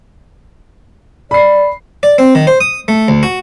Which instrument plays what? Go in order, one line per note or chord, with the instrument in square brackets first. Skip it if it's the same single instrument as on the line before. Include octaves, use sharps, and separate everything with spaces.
[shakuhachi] D5 [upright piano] B5 C7
[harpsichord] D5
C4
D#3
C5
D#6
A3
D2
F#4